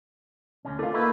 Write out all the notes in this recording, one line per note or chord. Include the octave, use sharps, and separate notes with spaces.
D2 D3 C#4
A3 D4 F4
A#3 D#4 E4 F#4 B4